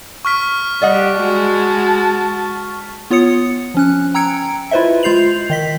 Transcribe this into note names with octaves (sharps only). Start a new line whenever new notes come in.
C#6 F6 B6
G3 G4 D5 D#5 F#5
G#3 F#4 A5
B3 F4 C#5 D#6 C#7
F3 C#4 F#6
G5 A#5 E6 G#6 C#7 D7
E4 F4 B4 C5 D#5 E5
G#3 F4 G6 C7 F7 F#7
D#3 D#5 B6